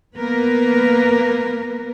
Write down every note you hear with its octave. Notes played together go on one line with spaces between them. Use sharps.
A#3 B3 A#4 B4